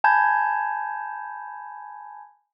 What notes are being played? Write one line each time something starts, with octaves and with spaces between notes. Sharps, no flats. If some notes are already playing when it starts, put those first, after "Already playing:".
G#5 A5 B5 G6 G#6